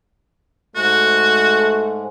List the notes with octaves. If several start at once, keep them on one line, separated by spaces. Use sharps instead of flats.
G#2 G#3 A3 F#4